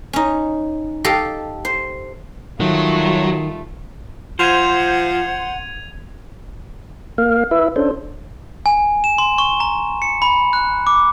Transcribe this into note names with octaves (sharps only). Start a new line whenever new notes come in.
C#4 D#4
G4 A4 D#5 F5
C5
D#3 F#3 G3 A3 F4
F3 C5 F#5 G#6 D#7 F7
A#3 F5
E4 B4 E5
C#4 D4 A4 C5
G#5
E7
C6
C#6
A#5
C#7
B5
F#6
D6